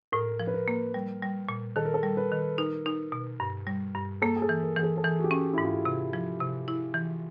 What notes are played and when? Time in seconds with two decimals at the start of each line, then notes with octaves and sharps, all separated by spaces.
0.12 A2 A#4
0.40 F3
0.47 B4
0.54 A#4
0.68 A#3
0.94 G3
1.22 G3
1.49 A#2
1.76 D#3 A4
1.85 A#4
1.94 A4
2.03 G3
2.17 B4
2.32 D#3
2.58 D#4 A#4
2.86 D#4
3.12 B2
3.40 G2
3.67 G3
3.95 G2
4.22 A#3 A4
4.36 G#4
4.42 A4
4.49 E3
4.63 A#4
4.77 E3 G#4
4.83 A4
4.97 A4
5.04 E3 G#4
5.19 F#4
5.24 G4
5.31 C#4
5.53 G#2 E4
5.65 F4
5.85 C3
6.13 F3
6.41 C3
6.68 E4
6.94 E3